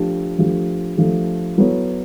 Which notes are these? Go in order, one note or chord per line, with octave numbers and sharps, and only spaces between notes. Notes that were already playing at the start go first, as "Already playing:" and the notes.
Already playing: F3 A3 D4 G4
F3 A3 D4 G4
F3 A3 D4 G4
F#3 B3 E4 A4 C#5